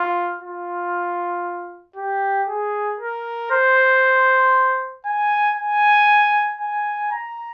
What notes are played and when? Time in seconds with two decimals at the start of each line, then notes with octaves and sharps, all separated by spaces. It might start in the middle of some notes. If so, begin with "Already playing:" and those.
Already playing: F4
0.42 F4
1.96 G4
2.48 G#4
3.00 A#4
3.51 C5
5.06 G#5
5.58 G#5
6.61 G#5
7.12 A#5